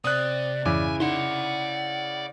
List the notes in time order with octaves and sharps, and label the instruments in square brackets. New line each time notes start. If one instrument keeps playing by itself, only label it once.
[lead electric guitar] C3 [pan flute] D5 [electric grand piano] D#6 F#6
[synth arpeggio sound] F2 G#2 E3 [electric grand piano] C#3 E4 D6 [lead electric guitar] G#5
[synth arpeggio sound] D#4 [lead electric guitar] D5 C6 [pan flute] F#5